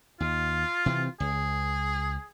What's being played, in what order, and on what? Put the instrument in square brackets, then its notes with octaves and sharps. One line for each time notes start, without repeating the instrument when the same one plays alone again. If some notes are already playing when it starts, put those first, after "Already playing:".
[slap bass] D#2 [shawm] F4
[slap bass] C3 E3 C4
[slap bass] C#2 [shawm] G#4